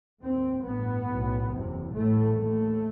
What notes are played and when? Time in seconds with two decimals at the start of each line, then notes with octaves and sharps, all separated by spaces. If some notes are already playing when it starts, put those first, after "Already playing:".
0.21 D#2 C4
0.63 A1 G2 B3
1.06 B1 A2
1.49 F#1 E2 C3
1.91 A1 A2 A3
2.34 D#2 A3